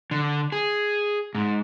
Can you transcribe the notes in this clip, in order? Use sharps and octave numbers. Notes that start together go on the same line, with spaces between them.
D3
G#4
G#2